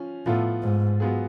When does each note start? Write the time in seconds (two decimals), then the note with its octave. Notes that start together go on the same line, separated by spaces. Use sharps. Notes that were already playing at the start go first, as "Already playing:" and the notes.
Already playing: F3 C#4
0.26 A2 F3 B3 F4 A4
0.62 G#2
1.00 F#3 B3 F4 G#4